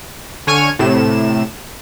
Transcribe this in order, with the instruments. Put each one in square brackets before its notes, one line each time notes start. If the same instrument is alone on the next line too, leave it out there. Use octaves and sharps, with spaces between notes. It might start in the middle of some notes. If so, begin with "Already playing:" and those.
[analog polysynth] D3 C#5 G#5 C#6 F6 D#7
A2 C3 E7